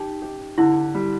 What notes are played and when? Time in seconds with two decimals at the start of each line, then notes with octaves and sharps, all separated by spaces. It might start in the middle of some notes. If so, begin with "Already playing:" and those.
Already playing: D#4 G4
0.22 G4
0.58 D3 E4
0.95 G3